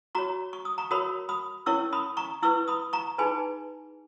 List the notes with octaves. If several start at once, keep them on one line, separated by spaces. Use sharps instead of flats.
F#4 C#5 A#5 C#6
C#6
D#6
A#5 C#6
F#4 A#4 C#5 B5 D#6
B5 D#6
C#4 E4 A#4 C#5 C#6 E6
B5 D#6
A#5 C#6
E4 B4 C#6 E6
B5 D#6
A#5 C#6
D#4 G#4 B4 G#5 B5